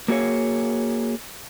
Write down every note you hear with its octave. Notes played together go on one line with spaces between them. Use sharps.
A#3 F#4 G#4 C#5